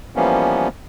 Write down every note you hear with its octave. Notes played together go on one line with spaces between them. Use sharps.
E3 F3 G3 A#3 B3 C#4